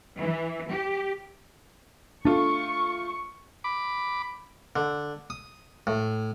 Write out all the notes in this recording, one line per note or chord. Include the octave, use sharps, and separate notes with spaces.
E3
G4
A3 D4 F4 C#6
B5 D6
D3
D#6
A2